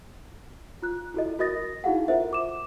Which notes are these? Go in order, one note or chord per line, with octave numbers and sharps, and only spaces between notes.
F4 F#6
E4 F#4 A4 D#5
F#4 A#4 D#5 D#6 A6 A#6
D#4 E4 F#4 G#4 F5 F#5
F4 A4 A#4 C5 E5 F#5
D6 E7